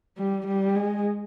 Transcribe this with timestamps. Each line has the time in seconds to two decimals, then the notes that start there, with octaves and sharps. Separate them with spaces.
0.17 G3
0.47 G3
0.76 G#3